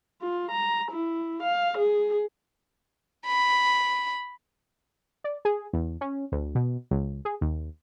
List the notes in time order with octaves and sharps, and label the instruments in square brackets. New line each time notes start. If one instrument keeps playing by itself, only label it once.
[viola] F4
A#5
E4
F5
G#4
[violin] B5
[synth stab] D5
G#4
E2
C#4
D2
B2
C#2
G#4
D#2